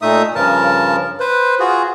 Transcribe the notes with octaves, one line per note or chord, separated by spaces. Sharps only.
A#2 A3 D#4 E5 D#6
G2 C#3 F3 A#4 A5
B4 C5
F4 F#4 G#4